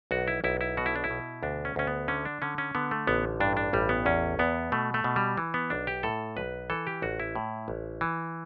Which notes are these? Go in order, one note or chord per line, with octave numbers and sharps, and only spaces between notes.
B1 F#4
E4
B1 E4
E4
B2 F#4
E4
D4
E4
B2
D2 D4
C#4
D2 C#4
B3
D3 C#4
D4
D3 C#4
C#4
D3 B3
A3
A1 B3
G2 D4
D4
A1 G3
B3
E2 C#4
E2 B3
B2 A3
A3
B2
G3
E3
B3
B1 D4
G4
A2 A4
B1 B4
E3 A4
G4
A1 F#4
E4
A2
A1
E3